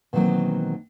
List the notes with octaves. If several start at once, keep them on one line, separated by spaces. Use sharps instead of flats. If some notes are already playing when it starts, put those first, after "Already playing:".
B2 D#3 E3 F#3 A#3 C4